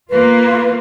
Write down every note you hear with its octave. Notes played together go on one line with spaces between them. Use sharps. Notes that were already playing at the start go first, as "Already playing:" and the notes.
A#3 F4 B4